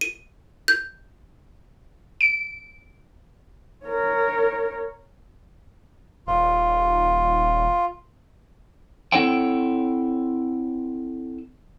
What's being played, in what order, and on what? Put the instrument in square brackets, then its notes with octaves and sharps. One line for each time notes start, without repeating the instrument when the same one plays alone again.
[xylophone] D#7
G6
[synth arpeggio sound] D7
[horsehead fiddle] A#4 C#5
[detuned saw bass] D#1 [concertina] F4
[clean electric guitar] C4 E4 A4 C#5 F#5 G5